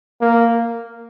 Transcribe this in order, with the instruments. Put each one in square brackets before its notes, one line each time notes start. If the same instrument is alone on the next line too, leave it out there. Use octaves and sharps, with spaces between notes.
[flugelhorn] A#3